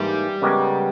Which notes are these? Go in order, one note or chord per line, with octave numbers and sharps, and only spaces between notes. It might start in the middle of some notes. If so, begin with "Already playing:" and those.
Already playing: G#2 E3 G3 A#3 E4
C#3 G#3 B3 G4 A#4